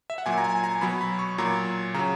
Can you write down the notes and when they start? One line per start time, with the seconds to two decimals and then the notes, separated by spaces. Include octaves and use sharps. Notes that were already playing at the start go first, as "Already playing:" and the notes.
0.10 E5
0.18 F#5
0.26 A#2 F#3 G#5
0.38 A#5
0.44 G#5
0.64 A#5
0.81 B2 F#3 B5
1.01 B5
1.19 C#6
1.38 A#2 F#3 A#5
1.94 C#3 F#3 A#5